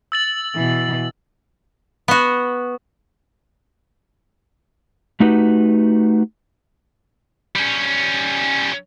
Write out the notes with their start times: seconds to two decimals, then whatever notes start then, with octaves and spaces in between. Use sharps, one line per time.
0.12 E6 A6 F#7
0.55 B2 E3
2.08 B3 F#4
5.20 A3 D#4 F#4 G4 B4
7.56 G3 C#4